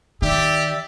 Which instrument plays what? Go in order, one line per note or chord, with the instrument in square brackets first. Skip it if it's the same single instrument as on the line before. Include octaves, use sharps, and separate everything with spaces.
[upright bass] D#3 [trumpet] G4 [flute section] D5 E5 E6